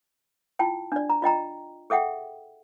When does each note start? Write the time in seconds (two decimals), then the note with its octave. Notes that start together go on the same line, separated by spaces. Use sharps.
0.59 E4 F4 G5 A5
0.92 D4 D5
1.10 A#5
1.22 F4 D#5 G5 A#5
1.90 G#4 A4 E5 F#5 G5